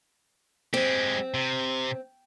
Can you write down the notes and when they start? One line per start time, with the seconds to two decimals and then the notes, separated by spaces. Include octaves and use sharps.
0.74 G#3 C4 G4
1.34 C3